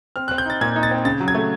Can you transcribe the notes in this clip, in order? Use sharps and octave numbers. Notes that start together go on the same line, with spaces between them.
C4 F6
F#6
C4
G6
D#4 A6
A#2 G#6
D#4
A6
C4
C#3 A6
F#3
G#6
A3